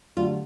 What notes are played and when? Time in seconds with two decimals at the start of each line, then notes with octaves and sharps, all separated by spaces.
0.17 D3 F#3 A3 D4 F4 G4